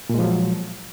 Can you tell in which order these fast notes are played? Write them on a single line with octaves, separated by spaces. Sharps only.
A#2 G#3 F3 F#3